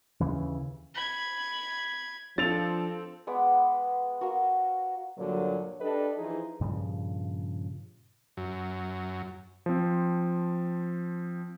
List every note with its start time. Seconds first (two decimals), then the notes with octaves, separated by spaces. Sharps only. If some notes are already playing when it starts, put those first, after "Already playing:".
0.20 D#2 C#3 E3
0.94 B5 G#6
2.38 F3 C4 D4 A4 A6 F7
3.27 G#3 B3 D6
4.21 F#4 A#4 F5
5.17 G2 A#2 D3 F#3
5.79 D4 G4 A4 B4 D#5
6.17 E3 F3 D#4 G#4 C5
6.61 G2 A#2 C#3 F3
8.37 F#2
9.66 F3 C4